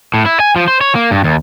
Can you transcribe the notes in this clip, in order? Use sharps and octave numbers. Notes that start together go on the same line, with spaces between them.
A2
E4
G#5
F3
C5
C#5
A#3
G2
D#2